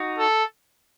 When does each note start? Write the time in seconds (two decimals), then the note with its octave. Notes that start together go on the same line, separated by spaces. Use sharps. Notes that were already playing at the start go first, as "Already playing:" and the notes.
Already playing: D#4 F#4
0.19 A4